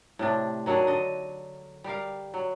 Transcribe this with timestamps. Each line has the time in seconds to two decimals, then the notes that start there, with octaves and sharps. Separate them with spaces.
0.19 A2 C3 D4
0.66 D#3 F#3 D4 G#4
0.87 D3 D#5
1.84 G3 G4 A#4 F5
2.34 F#3